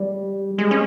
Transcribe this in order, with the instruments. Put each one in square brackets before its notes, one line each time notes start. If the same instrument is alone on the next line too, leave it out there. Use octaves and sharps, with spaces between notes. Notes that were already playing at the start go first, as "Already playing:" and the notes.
Already playing: [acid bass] G3
G#3
C#4